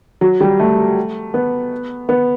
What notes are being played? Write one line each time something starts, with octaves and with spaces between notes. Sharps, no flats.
F#3
G3
A3
B3
B3